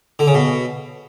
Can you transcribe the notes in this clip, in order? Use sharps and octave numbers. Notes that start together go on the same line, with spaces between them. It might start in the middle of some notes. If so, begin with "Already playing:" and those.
D3
C#3
B2